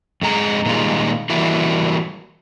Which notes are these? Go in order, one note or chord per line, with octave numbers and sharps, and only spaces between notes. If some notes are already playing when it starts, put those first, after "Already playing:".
F2 G#3 A#5
A#2 D#3 G3 G#3 F4
E3 G3 A#3 E4 F#4